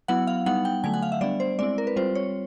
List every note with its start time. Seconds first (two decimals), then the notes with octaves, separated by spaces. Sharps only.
0.08 F#3 B3 E4 F#5
0.27 F5
0.46 G3 B3 D#4 F#5
0.65 G5
0.84 D3 F#3 A3 G#5
0.94 F#5
1.03 F5
1.12 E5
1.21 G3 B3 D4 D5
1.40 C5
1.59 G#3 C4 E4 D5
1.78 A#4
1.87 B4
1.96 G3 C4 F4 C5
2.15 C#5